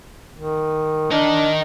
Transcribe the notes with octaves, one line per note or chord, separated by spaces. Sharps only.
D#3
D4 D#4 A#4